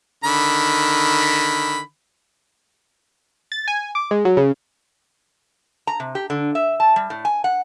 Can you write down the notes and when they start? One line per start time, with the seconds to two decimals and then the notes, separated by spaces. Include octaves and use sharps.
0.24 D3 D#3 B5
3.52 A6
3.68 G#5
3.95 D6
4.11 G#3
4.25 F#3
4.37 C#3
5.87 A#5
6.00 C3
6.15 G4
6.30 D3
6.55 E5
6.80 A5
6.96 G3
7.10 A2
7.25 G#5
7.44 F#5